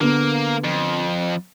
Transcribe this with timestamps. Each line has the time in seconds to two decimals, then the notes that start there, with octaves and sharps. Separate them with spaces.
0.01 D3 A#3 B3
0.64 F2